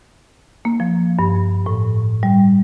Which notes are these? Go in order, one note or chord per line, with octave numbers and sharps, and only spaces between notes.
A#3
F3
G2
A2
G3